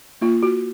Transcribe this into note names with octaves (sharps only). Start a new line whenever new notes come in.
A#3 F4
F#4